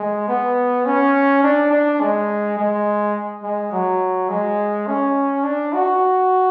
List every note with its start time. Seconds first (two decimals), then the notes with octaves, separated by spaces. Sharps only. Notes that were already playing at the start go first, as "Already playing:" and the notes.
Already playing: G#3
0.28 B3
0.86 C#4
1.43 D4
1.71 D4
2.00 G#3
2.57 G#3
3.43 G#3
3.72 F#3
4.29 G#3
4.87 C#4
5.43 D4
5.73 F#4